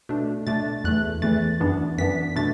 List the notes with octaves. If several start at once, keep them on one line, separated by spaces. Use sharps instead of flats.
B2 A3 D4
B2 A3 D4 A6
E2 E3 A3 F#6
E2 E3 A3 A6
F#2 E3 B3 D4
F#2 E3 B3 D4 B6
B2 A3 D4 A6